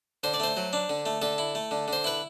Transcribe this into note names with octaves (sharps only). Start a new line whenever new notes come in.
D3 C5
D5
A3 C5
F#3
D4
D3
A3
D3 A4
E4
A3
D3
D3 C5
E4 B4